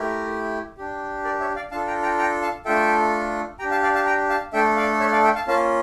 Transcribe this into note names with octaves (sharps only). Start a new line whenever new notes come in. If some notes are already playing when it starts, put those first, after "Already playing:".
Already playing: A3 E4 G4 A#4
D4 G4
A#4 D5
C#5 E5
D5 F5
D4 F4 A4 F5 A5
G5 A#5
G5 A#5
G5 A#5
F5 A5
A3 D4 F4 A4 E5 G5
D4 G4 G5 A#5
F5 A5
D5 F5
F5 A5
G5 A#5
F5 A5
A3 D4 A4 E5 G5
D5 F5
C#5 E5
D5 F5
E5 G5
F5 A5
A#3 C#4 F4 F5 A5